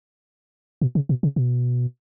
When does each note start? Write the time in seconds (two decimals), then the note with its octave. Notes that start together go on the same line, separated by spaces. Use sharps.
0.81 B2
0.95 C#3
1.09 B2
1.23 C#3
1.36 B2